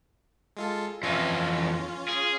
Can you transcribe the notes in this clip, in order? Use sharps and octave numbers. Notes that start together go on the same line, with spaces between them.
G#3 F4 A4
F2 E3 C#4 F4
G#4